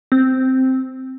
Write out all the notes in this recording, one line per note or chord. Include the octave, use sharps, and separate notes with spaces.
C4